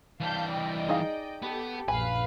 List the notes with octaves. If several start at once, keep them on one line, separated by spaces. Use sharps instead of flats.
E3 G3 F5 A5 G6
D5 D#5 G5
D#4 G#4 F5
B3 G4 A4
A#1 F#2 B4 F5 G#5